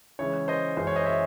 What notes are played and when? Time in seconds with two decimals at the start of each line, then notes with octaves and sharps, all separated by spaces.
0.19 C#3 E3 G#3 C#5
0.48 C5 D#5
0.77 F#2 E3 G#3 C5
0.87 C#5
0.96 C5 D#5
1.06 C#5 E5